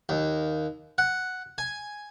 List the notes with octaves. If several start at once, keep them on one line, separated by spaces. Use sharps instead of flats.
D#2
F#5
G#5